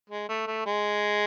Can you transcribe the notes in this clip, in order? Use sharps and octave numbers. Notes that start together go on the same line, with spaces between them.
G#3
A3
A3
G#3